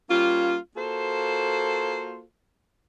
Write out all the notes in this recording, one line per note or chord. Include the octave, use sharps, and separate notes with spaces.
G3 A#3 C#4 F4
A#3 F4 F#4 A4 C5